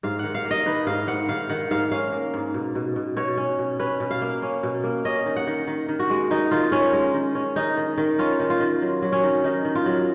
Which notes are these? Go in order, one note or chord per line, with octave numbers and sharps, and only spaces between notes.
G#2 F5
D#3 F#5
F5
A#3
D#5
D#3 B4
G#2 F5
G#2 F#5
D#3 F5
D#3 F#5
G#2 F5
C#4 F5
A#3
G#2
B2
B2
B2
B2 C#5
C#4
B2
C#4 B4
B2
F5
A#3
C#4
B2
A#3
C#4 D#5
D#3
F#5
D#3
D#3
D#3
F#4
G#3
D#3 D#4
D#3 F4
D#3 C#4
G#3
D#3
C#4
D#3 D#4
D#3
D#3
C#4 F4
D#3
F4
D#3
F#3
F#3
C#4
D#3
D#3 D#4
D#3
F4
F#3